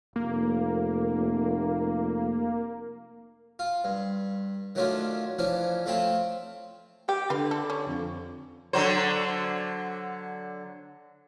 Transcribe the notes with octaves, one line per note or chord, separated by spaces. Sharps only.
F1 A#3
F4
G2
D#3 F#3 A3 C#4 D4 F4
E3 F3 C#4 D4
F3 A3 C4 F4 G5 A5
G4 G5
D3 D4 F4 B4
A4
C#4
F2
D3 F#3 C5